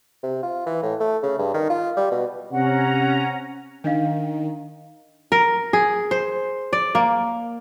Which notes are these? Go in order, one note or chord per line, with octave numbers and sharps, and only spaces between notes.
C3
F4
E3
A2
A3
C#3
G2
D#3
F4
G3
B2
C3 C#4 F#5 A#5
D#3 D4 D#5 F5
A#4
G#4
C5
D5
A#3